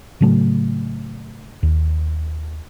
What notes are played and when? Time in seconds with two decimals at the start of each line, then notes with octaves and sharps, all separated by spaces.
0.21 A2 C#3 F#3 A3
1.63 D#2